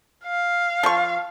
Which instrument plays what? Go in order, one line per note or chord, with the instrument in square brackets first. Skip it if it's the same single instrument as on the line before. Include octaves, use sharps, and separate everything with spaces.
[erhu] F5
[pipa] F3 C#6